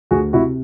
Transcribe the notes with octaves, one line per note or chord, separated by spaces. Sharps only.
D2 F#4 G#4
C3 E4 F#4